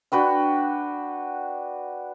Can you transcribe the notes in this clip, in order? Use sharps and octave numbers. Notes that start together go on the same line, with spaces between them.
D4 F#4 B4 G5